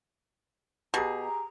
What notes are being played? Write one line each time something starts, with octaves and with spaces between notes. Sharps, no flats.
B2 G4 G#4 A#5